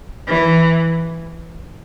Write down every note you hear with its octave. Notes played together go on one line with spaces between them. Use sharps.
E3